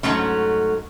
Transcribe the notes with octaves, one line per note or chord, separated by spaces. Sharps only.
G#2 D#3 F#3 A3 C#4